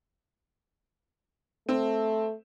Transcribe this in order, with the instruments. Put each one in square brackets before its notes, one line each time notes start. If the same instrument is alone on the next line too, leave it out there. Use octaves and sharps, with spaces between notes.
[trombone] A3 [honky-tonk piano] C4